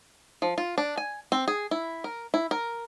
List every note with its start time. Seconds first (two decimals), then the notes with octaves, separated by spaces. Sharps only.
0.42 F3
0.58 F4
0.78 D4
0.98 G#5
1.32 C4
1.48 G#4
1.71 E4
2.04 A#4
2.34 E4
2.51 A#4